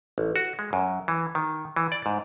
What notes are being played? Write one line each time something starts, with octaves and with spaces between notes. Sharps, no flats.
A1
F#4
G#3
F#2
E3
D#3
E3
D5
G#2